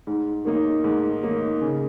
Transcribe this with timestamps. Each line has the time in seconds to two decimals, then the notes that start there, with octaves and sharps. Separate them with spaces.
0.07 G#2
0.45 D#3 A#3 D#4
0.84 G#2
1.23 D#3 A#3 D#4
1.61 C#3